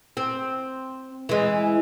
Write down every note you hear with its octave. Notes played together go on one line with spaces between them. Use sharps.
C4
E3 G#3